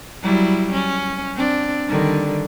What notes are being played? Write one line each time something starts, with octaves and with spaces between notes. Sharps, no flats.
F#3 G3 E4
C#4
C4 D4
D3 D#3 G3